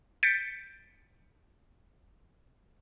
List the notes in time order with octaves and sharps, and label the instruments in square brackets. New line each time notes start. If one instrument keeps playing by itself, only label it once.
[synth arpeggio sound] G6 A6 B6 C#7 D7